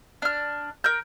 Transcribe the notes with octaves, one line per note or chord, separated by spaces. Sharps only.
D4 F6
A#4 G6